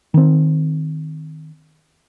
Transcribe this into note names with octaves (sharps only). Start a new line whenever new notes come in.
D#3 C4